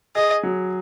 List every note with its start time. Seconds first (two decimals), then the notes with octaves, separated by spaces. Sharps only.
0.15 G#4 D#5
0.43 F#3